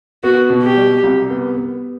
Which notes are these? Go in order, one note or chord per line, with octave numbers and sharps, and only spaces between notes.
B3 F#4
B2
G4
G3
C2
B3
B3